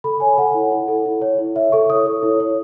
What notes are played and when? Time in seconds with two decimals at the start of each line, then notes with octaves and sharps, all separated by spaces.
0.04 A4 B5
0.20 C#5 G#5
0.38 A4 F#5
0.54 E4
0.72 E4
0.88 A4
1.06 E4
1.22 C#5
1.39 E4
1.55 C#5 E5
1.72 A4 C#6
1.90 C#5 D#6
2.06 A4
2.23 E4
2.40 C#5